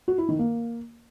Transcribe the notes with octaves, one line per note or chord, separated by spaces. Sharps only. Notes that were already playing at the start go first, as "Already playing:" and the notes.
F#4
E4
D#3
A#3